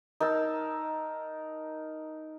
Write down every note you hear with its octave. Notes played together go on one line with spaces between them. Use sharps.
D#4 A#4 A5 E6